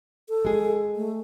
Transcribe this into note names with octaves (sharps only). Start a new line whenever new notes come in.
A4
G#3 G#4
A3